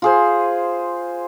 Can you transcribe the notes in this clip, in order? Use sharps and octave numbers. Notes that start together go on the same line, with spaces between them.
F4 G#4 C5